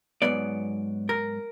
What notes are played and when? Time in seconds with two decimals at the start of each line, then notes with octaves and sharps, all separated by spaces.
0.22 G#2 F#3 B3 D5
1.09 A#4